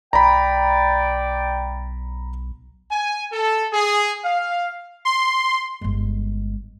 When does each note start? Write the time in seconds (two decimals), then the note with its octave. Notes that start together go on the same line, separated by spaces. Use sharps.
0.13 B1 D5 G5 A#5 B5
2.91 G#5
3.32 A4
3.73 G#4
4.24 F5
5.05 C6
5.81 G1 G#3